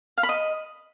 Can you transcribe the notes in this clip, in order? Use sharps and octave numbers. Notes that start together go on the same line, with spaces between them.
F5
B5
D#5